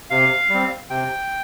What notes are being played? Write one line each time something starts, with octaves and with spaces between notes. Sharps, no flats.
C3 F5
G3 C4
C3 G5